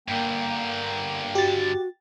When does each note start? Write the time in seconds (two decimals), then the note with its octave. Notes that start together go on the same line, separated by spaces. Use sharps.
0.08 G2 D3 A#3 G5
1.35 F#4 G4 A6